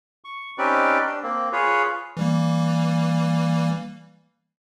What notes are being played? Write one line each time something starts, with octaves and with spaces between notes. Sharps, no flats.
C#6
C4 C#4 D#4 G4 B4 D5
D4
A#3 C4
F4 G#4 B4 C#5
E3 G3 A#3